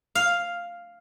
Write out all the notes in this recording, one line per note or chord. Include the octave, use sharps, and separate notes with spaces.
F5